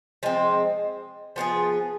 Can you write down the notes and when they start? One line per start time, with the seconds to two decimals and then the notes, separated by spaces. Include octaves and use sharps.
0.23 F3 G#3 C4
1.36 F3 B3 F4 G#4